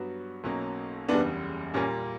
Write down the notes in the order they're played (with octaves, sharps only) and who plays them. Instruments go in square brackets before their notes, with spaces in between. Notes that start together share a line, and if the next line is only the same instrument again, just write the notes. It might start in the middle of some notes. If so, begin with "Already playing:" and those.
Already playing: [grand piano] G2 F#3 B3 F#4
B1 B2 F#3 A#3 C#4
[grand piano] F#1 E2 C#3 G3 [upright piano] B3 D4
[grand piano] A#2 G3 A#3 [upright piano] C#4